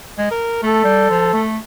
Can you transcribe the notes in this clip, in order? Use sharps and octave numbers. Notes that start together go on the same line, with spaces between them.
G#3
A#4
A3 A4
G3
F3
A3